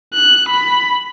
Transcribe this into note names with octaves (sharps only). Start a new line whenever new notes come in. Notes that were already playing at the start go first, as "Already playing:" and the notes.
F#6
B5